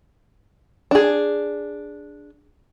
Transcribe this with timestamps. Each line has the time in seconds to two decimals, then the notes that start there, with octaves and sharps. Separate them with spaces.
0.91 D4 G#4